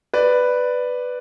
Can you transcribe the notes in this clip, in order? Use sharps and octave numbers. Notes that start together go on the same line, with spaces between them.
B4 D5